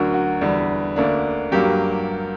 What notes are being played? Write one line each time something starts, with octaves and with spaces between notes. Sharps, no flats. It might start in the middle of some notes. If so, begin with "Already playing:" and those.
Already playing: D2 D3 F#3 F#4 A#4
F#4
E2 D3 G3
D2 D3 A#3 D4
G2 F#3 A#3 G4